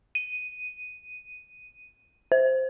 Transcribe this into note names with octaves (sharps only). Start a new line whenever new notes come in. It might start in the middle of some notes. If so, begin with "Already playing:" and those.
D#7
C5